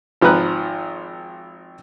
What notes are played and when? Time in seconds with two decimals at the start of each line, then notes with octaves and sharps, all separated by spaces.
0.21 G#1 F3 D#4 B4 A#5 F#6